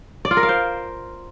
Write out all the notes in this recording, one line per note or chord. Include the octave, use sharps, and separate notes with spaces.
D5
F4
A#4
F5
C5